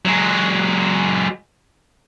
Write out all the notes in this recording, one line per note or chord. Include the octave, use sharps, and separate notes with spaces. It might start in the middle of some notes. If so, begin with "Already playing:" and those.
F#3 G#3